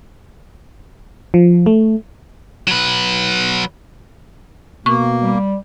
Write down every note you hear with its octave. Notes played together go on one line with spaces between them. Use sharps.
F3
A3
F#3 B4
B2 A#3 C#6
G3